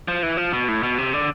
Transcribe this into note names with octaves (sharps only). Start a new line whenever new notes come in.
F3
E3
F3
B2
A2
B2
C3
D3